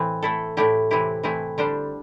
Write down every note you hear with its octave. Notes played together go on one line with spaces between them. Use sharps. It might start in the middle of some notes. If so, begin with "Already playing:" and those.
Already playing: A2 E3 C4
A3 E4 A4
A2 A3 E4 G4
C3 E3 C4 E4 G4
E3 A3 C4 E4
D3 G3 D4 G4 C5